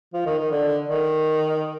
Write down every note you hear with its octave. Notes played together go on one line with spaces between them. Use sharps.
F3
D#3
D#3
D3
D#3